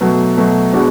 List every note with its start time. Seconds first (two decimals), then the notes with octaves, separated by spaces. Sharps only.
0.01 B2 F#3 A3
0.37 B2 F#3 A3
0.73 B2 G#3 B3 D4 F#4